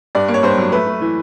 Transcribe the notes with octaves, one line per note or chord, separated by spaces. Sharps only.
G2 D5
A#3
C#5
G2 C5
F#3
A3 B4
A3
E3